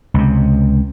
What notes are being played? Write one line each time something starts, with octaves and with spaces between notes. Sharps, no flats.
C#2 C3